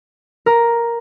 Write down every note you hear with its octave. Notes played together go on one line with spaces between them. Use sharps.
A#4